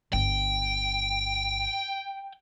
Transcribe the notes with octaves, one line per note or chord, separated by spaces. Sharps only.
G1 G5